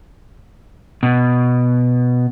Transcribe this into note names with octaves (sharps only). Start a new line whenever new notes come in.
B2